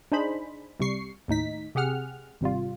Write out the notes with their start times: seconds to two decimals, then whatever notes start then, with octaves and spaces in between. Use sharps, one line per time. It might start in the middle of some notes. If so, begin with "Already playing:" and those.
0.12 D4 D#4 G#4 C5 B5
0.80 C2 C3 G3 C#6 C7
1.28 D#2 A2 D#4 B6
1.75 C3 G4 G#4 F#5 F6
2.41 G#1 C3 G3 F4